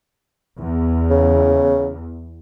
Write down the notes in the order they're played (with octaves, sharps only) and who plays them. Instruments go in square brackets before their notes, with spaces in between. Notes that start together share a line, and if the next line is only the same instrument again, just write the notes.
[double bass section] E2
[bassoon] C#3